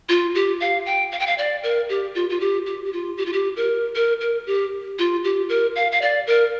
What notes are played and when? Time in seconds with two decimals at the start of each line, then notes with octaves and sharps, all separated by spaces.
0.09 F4
0.35 G4
0.60 F5
0.86 G5
1.12 F5
1.20 G5
1.27 F5
1.38 D5
1.63 A#4
1.89 G4
2.15 F4
2.30 F4
2.40 G4
2.66 G4
2.85 G4
2.93 F4
3.17 G4
3.26 F4
3.33 G4
3.56 A#4
3.95 A#4
4.21 A#4
4.47 G4
4.99 F4
5.24 G4
5.49 A#4
5.76 F5
5.92 F5
6.02 D5
6.27 A#4